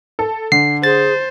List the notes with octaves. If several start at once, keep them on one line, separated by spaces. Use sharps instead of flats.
A4
D3 C7
G#4 C5 A6